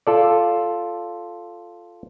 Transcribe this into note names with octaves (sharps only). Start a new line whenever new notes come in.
F4 A4 D5